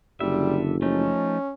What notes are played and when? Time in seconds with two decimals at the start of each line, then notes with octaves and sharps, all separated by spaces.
0.20 F#1 D3 G3 E5
0.82 F3 A3 C#4 D#4